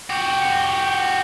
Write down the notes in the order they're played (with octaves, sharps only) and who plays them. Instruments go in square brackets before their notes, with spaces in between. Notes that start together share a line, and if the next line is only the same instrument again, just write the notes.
[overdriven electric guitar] F#4 G4